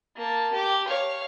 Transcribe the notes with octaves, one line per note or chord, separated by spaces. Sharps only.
A#3 A5
G4 D6
C#5 F5